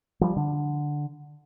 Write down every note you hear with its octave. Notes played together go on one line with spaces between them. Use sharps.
F3 G3
D3